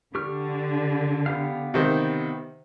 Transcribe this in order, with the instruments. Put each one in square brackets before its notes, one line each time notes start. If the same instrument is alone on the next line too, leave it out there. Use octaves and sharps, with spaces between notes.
[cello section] D3 [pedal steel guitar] G4 C#6 F6
[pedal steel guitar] B3 G4 F5
[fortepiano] C3 D#3 C5